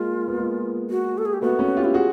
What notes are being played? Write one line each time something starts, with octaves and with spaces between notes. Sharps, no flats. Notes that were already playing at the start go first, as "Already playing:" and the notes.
Already playing: G#3 A#3 F4
B3
G#3 A#3
F#4
A4
G#4
G4
A3 B3 F#4
B3 C#4
F4 G4
E4
F4 F#4 G#4